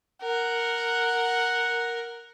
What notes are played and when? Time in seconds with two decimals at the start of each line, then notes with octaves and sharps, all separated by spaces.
0.22 A#4 F#5